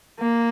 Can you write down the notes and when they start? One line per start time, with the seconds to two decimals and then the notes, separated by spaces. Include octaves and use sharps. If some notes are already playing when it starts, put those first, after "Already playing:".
0.20 A#3